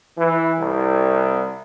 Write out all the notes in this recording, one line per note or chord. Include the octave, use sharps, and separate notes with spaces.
E3
C2